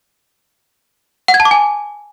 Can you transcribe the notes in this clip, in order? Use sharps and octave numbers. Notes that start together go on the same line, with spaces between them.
F#5
G#6
A5
D6
G#5